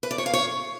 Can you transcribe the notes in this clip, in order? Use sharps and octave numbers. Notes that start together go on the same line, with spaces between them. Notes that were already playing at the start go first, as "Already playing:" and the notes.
B4
D5
C#5
F5
C#5